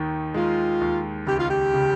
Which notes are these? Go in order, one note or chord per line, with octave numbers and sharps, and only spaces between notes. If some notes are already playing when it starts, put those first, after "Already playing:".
Already playing: D#2 D#3
G#3 F4
D#2
C#2 G4
F4
G4
C#3